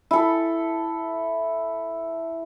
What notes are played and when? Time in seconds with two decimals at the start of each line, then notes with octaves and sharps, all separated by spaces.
0.11 E4 A4